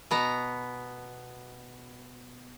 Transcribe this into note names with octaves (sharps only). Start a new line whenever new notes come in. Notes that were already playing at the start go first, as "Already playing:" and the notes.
B2 B3 A#5